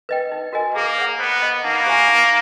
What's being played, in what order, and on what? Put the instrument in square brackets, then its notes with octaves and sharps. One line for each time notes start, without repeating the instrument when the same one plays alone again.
[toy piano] B4 D#5 G5
D#4
F#4 A#4 D#5 G#5
[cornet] A#3 [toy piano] G#4
[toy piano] C#5 F#5
[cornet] B3 [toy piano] C5
[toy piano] D#5 F#5 B5
[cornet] A#3 [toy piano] D#4
[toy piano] G4 C5 E5 G#5
D#4